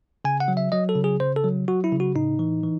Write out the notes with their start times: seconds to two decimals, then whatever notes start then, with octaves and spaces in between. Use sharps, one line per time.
0.25 C#3 G#5
0.40 F#5
0.48 F#3
0.57 E5
0.72 F#3 D#5
0.89 A4
0.96 C#3
1.04 G#4
1.20 C#3 C5
1.36 A4
1.44 F#3
1.68 F#3 F#4
1.84 E4
1.92 C#3
2.00 F#4
2.15 A2 D#4
2.39 E3
2.63 E3